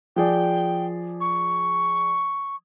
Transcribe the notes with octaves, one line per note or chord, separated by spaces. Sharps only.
F3 G#4 D5 G5
C#6